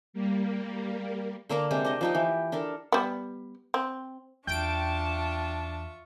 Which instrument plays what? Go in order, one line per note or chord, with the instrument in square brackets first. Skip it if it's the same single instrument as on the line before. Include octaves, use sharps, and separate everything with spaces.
[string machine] G3 A#3
[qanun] D3 A#3 D4 A#4
C3 G#3 G4
D4 D#5
F3 D#4 G4
E3
D4 A4 A#4
[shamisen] G3 B3
C4
[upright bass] E2 [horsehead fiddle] D4 A5 [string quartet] F4 E5 C#6 [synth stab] G5 D7